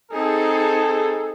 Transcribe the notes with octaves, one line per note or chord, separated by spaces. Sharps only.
C4 D#4 G#4 A4